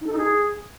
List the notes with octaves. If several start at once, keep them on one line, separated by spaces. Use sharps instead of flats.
D#4
A4
D#4
G#4